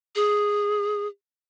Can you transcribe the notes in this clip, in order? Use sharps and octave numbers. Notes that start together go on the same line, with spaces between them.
G#4